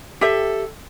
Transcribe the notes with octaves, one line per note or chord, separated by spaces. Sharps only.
G4 A4 E5